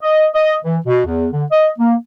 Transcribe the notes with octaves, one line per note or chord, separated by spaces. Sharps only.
D#5
D#5
E3
B2
E2
D3
D#5
A#3